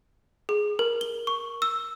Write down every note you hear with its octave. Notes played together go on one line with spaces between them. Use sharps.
G#4
A#4
G7
C#6
E6